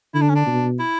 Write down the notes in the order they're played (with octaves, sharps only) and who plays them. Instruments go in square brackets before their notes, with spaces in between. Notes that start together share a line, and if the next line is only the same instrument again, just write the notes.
[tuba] D3 [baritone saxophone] E4
[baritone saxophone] D4
C#4
D4
[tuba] B2
[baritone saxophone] E4